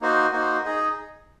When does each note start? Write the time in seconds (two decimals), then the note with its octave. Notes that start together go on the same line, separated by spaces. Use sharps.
0.01 A#3 D#4 F#4 C5
0.32 A#3 D#4 F#4 C5
0.64 D#4 G#4 D#5